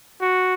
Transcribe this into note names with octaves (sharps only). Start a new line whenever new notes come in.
F#4